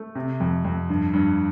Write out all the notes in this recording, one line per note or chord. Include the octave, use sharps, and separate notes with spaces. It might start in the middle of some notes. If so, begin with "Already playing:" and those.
Already playing: A3
C3
F2
F2
G2
G2